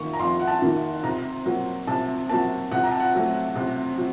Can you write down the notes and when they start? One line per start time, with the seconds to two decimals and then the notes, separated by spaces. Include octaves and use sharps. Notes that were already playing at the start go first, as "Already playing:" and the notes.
Already playing: F2 D#3 A#3 C#6
0.13 A#5
0.19 F2 C6
0.40 F#5
0.47 A5
0.62 D#3 A#3
1.03 C3 A#5
1.46 F#3 A#3
1.87 C3 A5
2.29 F#3 A#3 A5
2.71 C3 F#5
2.84 A#5
2.91 A5
3.00 F#5
3.14 F#3 A3
3.56 C3
3.98 F#3